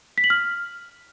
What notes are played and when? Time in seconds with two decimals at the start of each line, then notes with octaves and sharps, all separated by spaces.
0.18 B6
0.24 F#7
0.30 F6